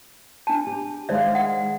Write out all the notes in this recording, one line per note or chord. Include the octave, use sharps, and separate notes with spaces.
D4 A5
G4
D#3 G#3 C5 D5 E5 F5
F#5